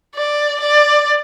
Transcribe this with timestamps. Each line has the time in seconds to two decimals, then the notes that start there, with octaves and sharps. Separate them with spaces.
0.16 D5
0.61 D5